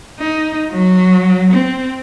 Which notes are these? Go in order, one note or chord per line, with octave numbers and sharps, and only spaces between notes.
D#4
F#3
C4